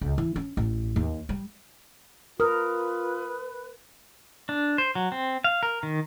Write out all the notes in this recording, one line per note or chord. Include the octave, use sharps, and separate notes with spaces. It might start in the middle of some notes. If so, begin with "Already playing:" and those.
C#2
E3
C#4
A1
D#2
G3
F4 A#4 B4 D#6 F6
D4
C5
F#3
C4
F5
A#4
D#3